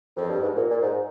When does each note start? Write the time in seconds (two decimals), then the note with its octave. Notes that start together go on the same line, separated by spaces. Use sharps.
0.17 F2
0.29 G2
0.42 G#2
0.55 A#2
0.69 A#2
0.81 G#2